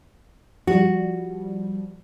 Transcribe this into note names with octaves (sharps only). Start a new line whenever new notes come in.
F3 G3 F#4